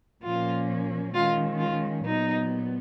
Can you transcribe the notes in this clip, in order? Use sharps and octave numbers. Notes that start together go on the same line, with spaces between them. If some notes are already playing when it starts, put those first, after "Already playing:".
A#2 F3 A#3 C#4 F4
D#3 G#3 C#4 F4
F4
A#2 F#3 B3 D#4